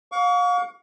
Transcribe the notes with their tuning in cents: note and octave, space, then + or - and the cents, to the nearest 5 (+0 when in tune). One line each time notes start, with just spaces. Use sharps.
F5 +35 C#6 +40